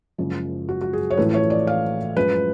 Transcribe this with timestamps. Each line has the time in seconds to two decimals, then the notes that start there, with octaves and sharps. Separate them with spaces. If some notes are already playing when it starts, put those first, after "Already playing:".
0.18 F#1 F#2 F3 G#3
0.69 F#4
0.81 F#4
0.93 G#4
1.10 C#5
1.17 A1 A2 F3 A3 B4
1.34 C#5
1.50 D5
1.67 F5
2.16 F#2 F3 G#3 B4